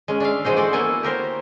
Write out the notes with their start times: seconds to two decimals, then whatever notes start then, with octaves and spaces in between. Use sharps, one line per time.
0.08 G#3 C#4
0.20 D4 D5 E5 F5
0.44 E3 F3 G#3 F#4 C5
0.56 F#4 A4 C5 D5 F#5
0.73 A#3 B3 E4 A4 G#5
1.03 G4 A#4 C5 C#5